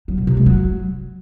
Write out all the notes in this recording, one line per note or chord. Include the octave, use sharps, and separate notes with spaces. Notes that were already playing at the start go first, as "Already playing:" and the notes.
F#3
B2
C3
G#3
F#3